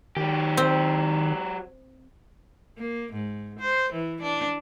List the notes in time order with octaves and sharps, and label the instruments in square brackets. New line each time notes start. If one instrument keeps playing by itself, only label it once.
[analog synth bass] D#3 [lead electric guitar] F#3 G4
[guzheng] C4
[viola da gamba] A#3
G#2
C5
E3
D4